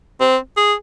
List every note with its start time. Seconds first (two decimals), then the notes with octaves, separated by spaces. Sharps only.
0.21 C4
0.57 G#4